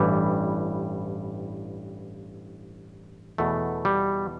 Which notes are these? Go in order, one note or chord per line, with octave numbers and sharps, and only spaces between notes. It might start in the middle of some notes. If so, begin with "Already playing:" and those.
Already playing: A1 G2 E3 G3
E2 B2 A3
G3